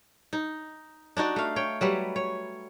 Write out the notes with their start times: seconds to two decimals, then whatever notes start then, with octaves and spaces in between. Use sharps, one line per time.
0.33 D#4
1.17 D4 D#4 F#4 D5
1.36 A3 F5
1.56 C#5 G5
1.81 F#3 G3 B4
2.16 C#5